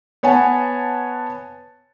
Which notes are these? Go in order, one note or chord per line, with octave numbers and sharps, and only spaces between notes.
B3 C#5 F#5 G#5 A5